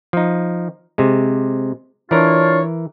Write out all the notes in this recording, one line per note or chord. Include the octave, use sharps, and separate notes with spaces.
F3 D#4
C3 G#3
E3 D4 F4 A#4 C#5